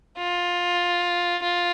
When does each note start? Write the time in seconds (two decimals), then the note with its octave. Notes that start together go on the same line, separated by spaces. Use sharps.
0.18 F4
1.43 F4